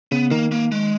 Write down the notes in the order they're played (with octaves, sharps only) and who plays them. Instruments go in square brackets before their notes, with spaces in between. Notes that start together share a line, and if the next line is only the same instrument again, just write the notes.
[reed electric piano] C#3 [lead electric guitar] B3
[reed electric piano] D#3 [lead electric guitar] A#3
[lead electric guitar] A#3
G#3